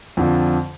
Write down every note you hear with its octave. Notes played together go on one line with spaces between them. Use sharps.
F2 D3 F3